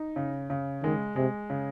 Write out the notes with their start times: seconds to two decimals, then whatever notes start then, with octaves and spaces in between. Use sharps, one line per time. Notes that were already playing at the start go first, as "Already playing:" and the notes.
Already playing: D#4
0.16 C#3
0.50 C#3
0.83 D#3 G#3
1.16 C3 G#3
1.50 C#3